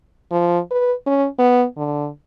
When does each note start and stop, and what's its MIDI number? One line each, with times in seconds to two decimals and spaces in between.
0.31 0.59 53
0.71 0.93 71
1.06 1.27 61
1.39 1.65 59
1.77 2.08 50